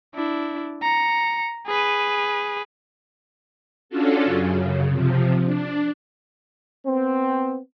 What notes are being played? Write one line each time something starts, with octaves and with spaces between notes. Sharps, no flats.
D4 E4
A#5 C#7
G#4 B4
C#4 D4 F4 F#4 A4
F#2 C#3
C3 F3
D4
B3 C4